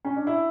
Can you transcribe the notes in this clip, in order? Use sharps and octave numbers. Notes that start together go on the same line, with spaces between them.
C#4
D4
E4